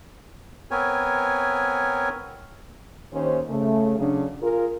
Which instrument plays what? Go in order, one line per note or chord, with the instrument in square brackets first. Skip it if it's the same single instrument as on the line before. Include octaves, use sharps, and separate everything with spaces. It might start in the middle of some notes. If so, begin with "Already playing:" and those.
[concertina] B3 C4 A#4 C#5 G#5
[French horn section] D#2 C#4 C5
C#3 A3
C#3 F#3 D4
F4 G#4 A#4